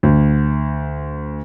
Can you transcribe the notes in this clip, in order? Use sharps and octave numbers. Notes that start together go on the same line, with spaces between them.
D2